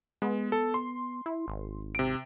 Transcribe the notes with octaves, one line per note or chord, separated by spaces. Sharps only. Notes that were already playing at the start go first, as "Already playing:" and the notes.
G#3 B3
A4
C6
E4
G#1
C3 D7